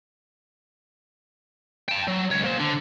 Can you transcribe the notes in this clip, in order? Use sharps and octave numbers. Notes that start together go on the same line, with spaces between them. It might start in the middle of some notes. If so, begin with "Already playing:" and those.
G5 A5
F#3
C#2 C#5
A#3 C5
D3